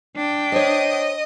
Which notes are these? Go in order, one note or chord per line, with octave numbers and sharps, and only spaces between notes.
D4 G5
C5 C#5 D#5 D#6